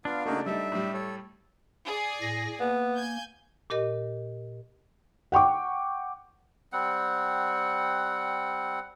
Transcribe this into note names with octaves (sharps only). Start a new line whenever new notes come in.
B3 D4 F4 F5
C#3 A3 A#3 D#4 F#4
G3 A3 D#4 E5
A2 G3
A4 C#5
G#4 D5 G#5
A2 A#6
A#3 B3
G#5 G6 G#6
A#2 G4 A#4 D#5
F#5 G5 C#6 D6
G3 C4 F#5